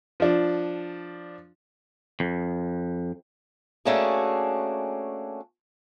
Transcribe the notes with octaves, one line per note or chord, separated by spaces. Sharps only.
F3 D4
F2
A3 A#3 C#4 D4 F#4 G#4